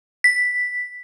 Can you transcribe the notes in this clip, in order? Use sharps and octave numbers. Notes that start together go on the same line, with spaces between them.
B6